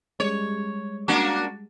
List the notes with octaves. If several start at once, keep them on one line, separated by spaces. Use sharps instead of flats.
G3 G#3 C#5
A#3 D4 F#4